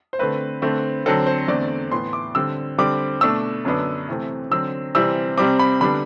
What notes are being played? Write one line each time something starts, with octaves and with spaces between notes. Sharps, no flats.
C5
D3 A3 C4 B4
D3 A3 C4
D3 F#3 C4 A4
C5
E2 D3 A3 C4 D5
A2 E3 B3 C6
D6
D3 G3 C4 E6
D3 G3 C4 D6
B2 A3 D4 E6
F#2 D3 F#3 B3 D4
C3 E3 A3 C4
D3 F#3 C4 E6
C3 E3 G3 C4 E6
C3 G3 C4 D6
B5
D3 G3 B3 D4 B5